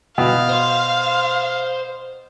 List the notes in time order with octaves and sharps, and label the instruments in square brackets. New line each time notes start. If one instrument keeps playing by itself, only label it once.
[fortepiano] B2 [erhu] F5
[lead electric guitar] C5 C6